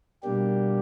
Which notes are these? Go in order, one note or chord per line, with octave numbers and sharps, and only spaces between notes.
B2 G3 A#3 D4 G4